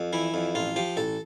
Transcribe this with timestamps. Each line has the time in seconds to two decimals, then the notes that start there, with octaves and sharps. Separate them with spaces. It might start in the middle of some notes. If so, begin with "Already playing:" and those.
Already playing: F2
0.13 E3 E4
0.34 F2
0.55 A1 F4
0.76 F3 G4
0.97 A1 A4